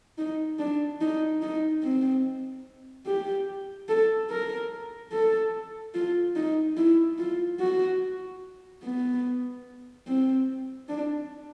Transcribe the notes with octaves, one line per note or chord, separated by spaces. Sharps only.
D#4
D4
D#4
D#4
C4
G4
A4
A#4
A4
F4
D#4
E4
F4
F#4
B3
C4
D4